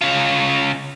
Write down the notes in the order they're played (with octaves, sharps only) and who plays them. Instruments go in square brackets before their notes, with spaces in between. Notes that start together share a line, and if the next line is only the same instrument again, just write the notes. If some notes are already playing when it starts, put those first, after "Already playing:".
[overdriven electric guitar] C#3 F4